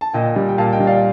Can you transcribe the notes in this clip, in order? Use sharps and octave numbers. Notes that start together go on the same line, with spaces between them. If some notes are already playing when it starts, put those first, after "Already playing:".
A5
A#2 D#5 G5
G3
G5
A#2 F5 A5
D#5 G5
G3
D5 F5